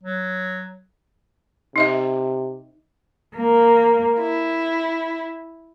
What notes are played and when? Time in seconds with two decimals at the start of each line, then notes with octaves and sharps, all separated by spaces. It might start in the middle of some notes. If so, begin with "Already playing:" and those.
0.03 F#3
1.76 C3 D#4 D#5 E5
3.37 A#3
4.18 E4